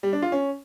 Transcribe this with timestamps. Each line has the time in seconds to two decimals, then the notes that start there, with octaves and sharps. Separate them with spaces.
0.03 G3
0.13 D4
0.22 F4
0.32 C#4